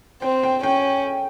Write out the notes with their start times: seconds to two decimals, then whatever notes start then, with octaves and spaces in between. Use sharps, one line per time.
0.22 C4 G5
0.43 G5
0.63 C#4 G5